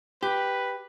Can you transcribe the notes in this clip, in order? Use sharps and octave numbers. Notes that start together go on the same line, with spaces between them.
G4 B4